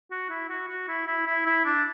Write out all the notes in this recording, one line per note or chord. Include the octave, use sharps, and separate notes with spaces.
F#4
E4
F#4
F#4
E4
E4
E4
E4
D4